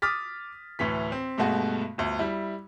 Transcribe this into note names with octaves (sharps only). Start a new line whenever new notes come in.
D6 D#6 F6 A6 B6
D2 A2 E3 B6
C4
G2 B2 G#3 A3 F#4
G1 D2
G3 E4